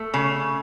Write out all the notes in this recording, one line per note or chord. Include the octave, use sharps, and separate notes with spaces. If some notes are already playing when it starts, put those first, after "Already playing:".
Already playing: A3
C#3